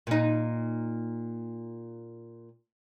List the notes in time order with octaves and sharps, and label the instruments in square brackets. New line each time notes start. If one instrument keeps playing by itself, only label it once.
[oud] A#2 D#4